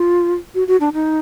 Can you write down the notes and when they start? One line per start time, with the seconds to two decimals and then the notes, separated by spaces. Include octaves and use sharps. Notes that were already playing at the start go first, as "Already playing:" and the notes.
Already playing: F4
0.55 F#4
0.68 F#4
0.80 D4
0.93 D#4